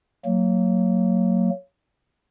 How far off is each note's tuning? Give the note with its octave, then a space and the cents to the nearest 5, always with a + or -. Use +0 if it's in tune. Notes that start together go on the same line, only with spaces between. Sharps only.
F#3 +0 A#3 -25